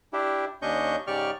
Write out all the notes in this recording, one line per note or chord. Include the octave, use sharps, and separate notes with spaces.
D4 E4 G4
D#2 C#4 D4 D#5 C#6 G6
G#2 C#3 G4 D5 C#6 F6